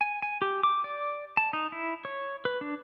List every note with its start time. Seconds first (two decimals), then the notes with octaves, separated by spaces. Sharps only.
0.01 G#5
0.22 G#5
0.42 G4
0.63 D6
0.84 D5
1.37 A5
1.53 D#4
1.72 E4
2.05 C#5
2.45 B4
2.61 D4